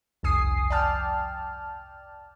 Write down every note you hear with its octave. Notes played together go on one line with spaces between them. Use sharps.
G1 C2 F2 G#5 D#6 C7
D5 G5 A5 F6